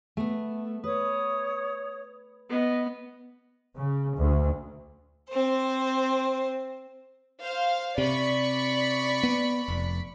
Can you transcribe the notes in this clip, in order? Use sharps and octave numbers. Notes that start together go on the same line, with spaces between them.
A3 B3
B4 C#5 D#6
B3 D#5
C#3
D2
C4 C5
C5 F5
C3 D5 B5 C#6
B3
F1